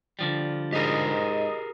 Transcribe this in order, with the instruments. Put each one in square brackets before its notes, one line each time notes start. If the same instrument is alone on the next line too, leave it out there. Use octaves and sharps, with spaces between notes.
[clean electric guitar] D3 F3 G3
[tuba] G#2 [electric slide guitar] G4 G#4 A#4 [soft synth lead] D#5